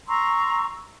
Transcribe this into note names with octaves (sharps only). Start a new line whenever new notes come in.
A#5 C6 C#6 E6